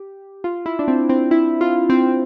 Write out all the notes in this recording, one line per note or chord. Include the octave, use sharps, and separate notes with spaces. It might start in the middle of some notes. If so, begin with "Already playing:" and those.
Already playing: G4
F4
E4
D4
C4
C4
E4
F4
C4